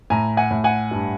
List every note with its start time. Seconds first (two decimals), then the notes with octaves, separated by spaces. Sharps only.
0.10 A2 G#5 A#5
0.37 F#5 G#5
0.51 A2
0.64 F#5 G#5
0.91 G2